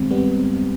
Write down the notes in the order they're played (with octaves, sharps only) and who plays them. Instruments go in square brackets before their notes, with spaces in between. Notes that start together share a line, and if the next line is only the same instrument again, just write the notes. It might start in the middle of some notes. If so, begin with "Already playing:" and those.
Already playing: [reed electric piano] G2 D#3 G#3 C4 [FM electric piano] G3
[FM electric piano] G3 B3